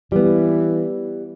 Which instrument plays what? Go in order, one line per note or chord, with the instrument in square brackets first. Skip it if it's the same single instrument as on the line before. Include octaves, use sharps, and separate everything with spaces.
[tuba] E3 [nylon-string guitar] G3 B3